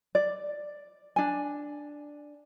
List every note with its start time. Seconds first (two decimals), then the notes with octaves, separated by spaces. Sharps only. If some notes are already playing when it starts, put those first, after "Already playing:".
0.15 D5
1.16 D4 G#5